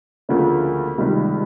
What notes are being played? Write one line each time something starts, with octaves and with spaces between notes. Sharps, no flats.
D2 C#3 F3 A#3
C#2 C3 D#3 G3